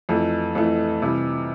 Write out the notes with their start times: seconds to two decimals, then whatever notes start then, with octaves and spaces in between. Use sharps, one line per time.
0.09 F2 E3 A3
0.55 F2 E3 A3
1.02 C3 E3 G3